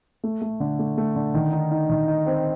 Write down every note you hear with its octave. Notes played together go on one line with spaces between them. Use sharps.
A3
A3
D3
A3
A3
D3
D#3
D#4
D#4
D#3
D#4
C4